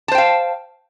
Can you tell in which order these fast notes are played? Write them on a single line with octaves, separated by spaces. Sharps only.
A5 C5 G5 F5